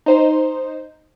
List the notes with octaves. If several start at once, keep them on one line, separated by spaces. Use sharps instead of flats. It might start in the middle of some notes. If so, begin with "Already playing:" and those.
D#4 C5